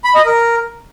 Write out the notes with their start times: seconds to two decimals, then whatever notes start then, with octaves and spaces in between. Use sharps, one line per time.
0.04 B5
0.15 D#5
0.25 A#4